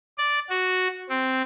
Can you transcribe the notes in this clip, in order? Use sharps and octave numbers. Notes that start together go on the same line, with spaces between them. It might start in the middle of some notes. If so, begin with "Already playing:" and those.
D5
F#4
C4